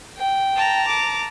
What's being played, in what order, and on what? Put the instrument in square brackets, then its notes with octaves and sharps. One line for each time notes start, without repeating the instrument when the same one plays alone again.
[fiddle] G5
[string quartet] A5 A#5
[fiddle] D6